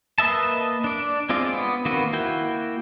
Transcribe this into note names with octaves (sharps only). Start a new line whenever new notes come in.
A#3 B4 D#5 E5 A5
D4 D5
G#3 C4 F4 D5
B3
D#3 A#3 C4 F#4 B4
A#3 E4 F#4 G5